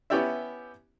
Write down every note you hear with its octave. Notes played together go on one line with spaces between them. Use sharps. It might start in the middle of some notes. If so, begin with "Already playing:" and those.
B3 C#4 E4 G4 D5 E5